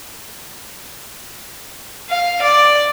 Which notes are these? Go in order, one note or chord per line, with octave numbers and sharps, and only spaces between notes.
F5
D5